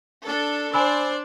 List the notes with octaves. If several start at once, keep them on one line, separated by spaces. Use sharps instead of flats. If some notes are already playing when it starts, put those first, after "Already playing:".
D4 A4
D4 C5 D5 G#5 B5 E6